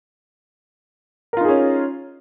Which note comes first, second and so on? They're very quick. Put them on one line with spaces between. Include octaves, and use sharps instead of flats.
A#4 F4 D#4 G#4 C#4